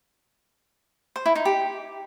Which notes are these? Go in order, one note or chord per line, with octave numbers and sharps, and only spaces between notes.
C5
E4
D#4
G4